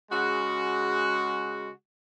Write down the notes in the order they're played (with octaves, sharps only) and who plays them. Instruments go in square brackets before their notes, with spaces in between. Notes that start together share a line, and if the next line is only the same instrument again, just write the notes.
[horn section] C#3 G#3 F#4